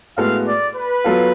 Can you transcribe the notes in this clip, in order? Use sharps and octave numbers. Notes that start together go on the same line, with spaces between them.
A2 G#3 B3 F#4 A4 F5
D5
B4
F#3 B3 F4 A4 F5